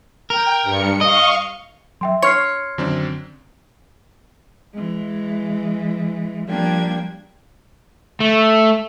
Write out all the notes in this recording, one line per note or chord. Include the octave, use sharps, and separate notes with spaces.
A#4 G5
G2 C#7
D#5 F5 C#6
F#3 E5 G5 C6
D4 C#5 C6 F6 C7
F#2 D3 D#3 F#3 C4 D4
E3 G#3
F3 G3 A#3 D4 G5 G#6
A3